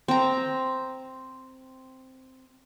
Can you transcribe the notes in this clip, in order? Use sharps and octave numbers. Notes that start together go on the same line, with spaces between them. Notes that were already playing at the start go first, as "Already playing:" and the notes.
C4 A#5